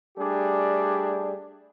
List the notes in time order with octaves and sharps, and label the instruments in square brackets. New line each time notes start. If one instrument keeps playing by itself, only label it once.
[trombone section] G3 A3 D4 G4 G#4